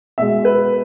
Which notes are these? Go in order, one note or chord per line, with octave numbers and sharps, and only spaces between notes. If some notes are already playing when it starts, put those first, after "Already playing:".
B2 G#3 E5
B4